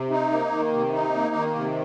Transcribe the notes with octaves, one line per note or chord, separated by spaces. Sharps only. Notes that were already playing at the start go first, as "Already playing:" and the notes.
Already playing: C3
D#4
A#3
D#3
C3
D#4
A#3
D#3
C3